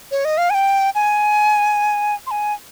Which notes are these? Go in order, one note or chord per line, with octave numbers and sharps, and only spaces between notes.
C#5
D#5
F5
G#5
G5
G#5
C6
G#5